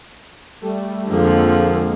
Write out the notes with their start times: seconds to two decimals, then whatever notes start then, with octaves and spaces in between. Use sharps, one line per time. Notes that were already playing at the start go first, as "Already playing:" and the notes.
0.62 G3 A3
1.09 F2 D3 F3 G#3 A#3